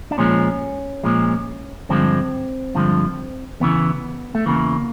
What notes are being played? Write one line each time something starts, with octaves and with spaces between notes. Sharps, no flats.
D4
A#2 F3 G#3 C#4
A#2 F3 G#3
G2 D3 F3 G#3 C4
G2 D3 F3 G#3
E2 C#3 E3 B3
A3
E2 C#3 E3 A#3